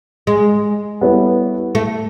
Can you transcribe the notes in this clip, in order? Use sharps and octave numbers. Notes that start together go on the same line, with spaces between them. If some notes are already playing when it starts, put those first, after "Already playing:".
G#3
G3 B3 E4 A4 C#5
A3